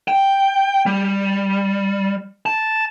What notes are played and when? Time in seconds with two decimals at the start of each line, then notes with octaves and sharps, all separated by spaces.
0.08 G5
0.86 G3
2.46 A5